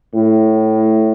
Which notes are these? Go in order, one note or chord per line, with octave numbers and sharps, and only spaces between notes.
A2